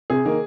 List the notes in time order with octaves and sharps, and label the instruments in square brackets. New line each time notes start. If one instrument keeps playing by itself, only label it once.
[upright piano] C3 G#4
D#3 A#3